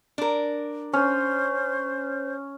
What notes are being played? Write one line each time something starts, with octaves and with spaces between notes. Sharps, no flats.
D4 A#4
C#4 C5